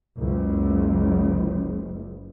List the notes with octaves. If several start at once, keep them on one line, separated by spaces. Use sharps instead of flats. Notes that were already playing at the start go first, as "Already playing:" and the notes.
F#1 C#2